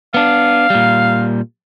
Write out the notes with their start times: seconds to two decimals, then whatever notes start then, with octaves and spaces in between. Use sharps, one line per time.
0.14 B3 D4 F5
0.70 A#2 G3